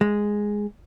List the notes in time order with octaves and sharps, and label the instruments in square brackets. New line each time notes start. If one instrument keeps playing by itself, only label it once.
[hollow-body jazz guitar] G#3